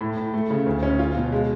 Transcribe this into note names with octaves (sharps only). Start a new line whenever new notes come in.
A2
A2
A3
C#3
D2
C#4
F4
B2
G#3